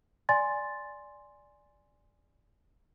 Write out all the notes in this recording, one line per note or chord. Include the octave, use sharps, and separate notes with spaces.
D5 G#5 C6 A6